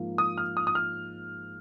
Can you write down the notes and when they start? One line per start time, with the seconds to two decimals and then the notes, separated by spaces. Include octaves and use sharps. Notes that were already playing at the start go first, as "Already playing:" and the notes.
Already playing: G#2 F3 A#3 F4
0.18 D#6
0.38 F6
0.57 D#6
0.67 D#6
0.75 F6